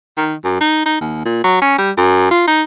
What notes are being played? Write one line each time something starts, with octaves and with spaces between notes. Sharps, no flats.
D#3
F#2
D#4
D#4
D#2
A#2
F#3
C#4
G3
F#2
F4
D#4